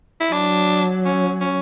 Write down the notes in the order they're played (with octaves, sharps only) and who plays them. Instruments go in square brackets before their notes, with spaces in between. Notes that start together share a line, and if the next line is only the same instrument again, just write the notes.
[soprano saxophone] E4
[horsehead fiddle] F#3 [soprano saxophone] D4
[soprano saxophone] C#4
C#4